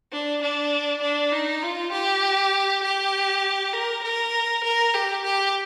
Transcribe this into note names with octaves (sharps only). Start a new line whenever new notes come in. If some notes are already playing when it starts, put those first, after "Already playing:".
D4
D4
D4
D#4
F4
G4
G4
A#4
A#4
A#4
G4
G4